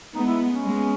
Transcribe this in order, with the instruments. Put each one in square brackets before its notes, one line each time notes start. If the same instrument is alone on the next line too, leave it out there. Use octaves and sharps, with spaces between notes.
[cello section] G#3 B3 [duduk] D#4
[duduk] E4
C#4
[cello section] G#3 B3